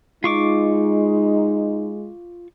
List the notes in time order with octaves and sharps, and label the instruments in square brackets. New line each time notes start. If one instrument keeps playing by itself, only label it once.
[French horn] G#3 [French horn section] D#4 [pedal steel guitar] F4 C#6 D6